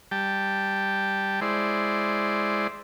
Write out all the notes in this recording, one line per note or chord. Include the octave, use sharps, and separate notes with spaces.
G3 G5 A5
G#3 E4 C5 D5